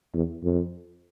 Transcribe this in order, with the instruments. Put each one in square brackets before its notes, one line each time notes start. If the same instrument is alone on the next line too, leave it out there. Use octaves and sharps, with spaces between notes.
[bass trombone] E2
F2